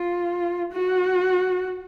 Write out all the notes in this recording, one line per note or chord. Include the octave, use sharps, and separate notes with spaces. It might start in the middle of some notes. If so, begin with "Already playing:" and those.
Already playing: F4
F#4